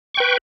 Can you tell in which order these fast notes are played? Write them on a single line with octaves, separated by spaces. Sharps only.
C#6 G5 B4